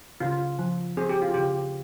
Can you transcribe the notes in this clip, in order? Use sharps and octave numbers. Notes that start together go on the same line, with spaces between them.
C#3 F4
F3
C4 G#4
G4
F4
C#3 G4